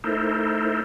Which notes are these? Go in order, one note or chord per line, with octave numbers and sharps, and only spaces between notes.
A3 D#4 E4 A4 A#4 C5